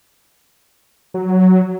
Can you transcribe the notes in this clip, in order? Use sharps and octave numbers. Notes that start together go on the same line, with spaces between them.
F#3